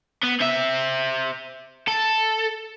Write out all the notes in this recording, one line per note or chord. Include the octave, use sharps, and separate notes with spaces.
B3
C4 E5
A4